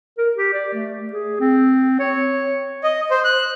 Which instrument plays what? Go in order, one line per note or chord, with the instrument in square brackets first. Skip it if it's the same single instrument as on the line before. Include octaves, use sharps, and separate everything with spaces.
[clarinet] A#4
G4
D5
A3
G#4
C4
C#5
[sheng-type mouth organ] D#5
C5
F#6